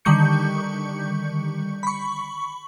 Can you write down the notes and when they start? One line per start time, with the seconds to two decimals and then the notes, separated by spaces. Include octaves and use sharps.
0.05 D3 D#3 G3 C#6 G6 C#7
1.83 B5 C#6